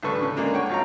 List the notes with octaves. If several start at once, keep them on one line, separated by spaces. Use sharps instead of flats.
A1 D2 D4 A4 B4 C#6
C#3
G#3 A#3 D4
C#5 F#5 G5 C#6
G#1 B2 F4 C#5 A#5